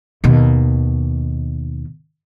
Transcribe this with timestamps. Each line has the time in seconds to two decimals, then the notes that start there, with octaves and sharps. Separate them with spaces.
0.24 D#2 B2